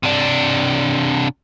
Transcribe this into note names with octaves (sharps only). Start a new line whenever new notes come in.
C3 D4